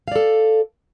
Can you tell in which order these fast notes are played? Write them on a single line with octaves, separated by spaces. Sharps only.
F5 D5 A4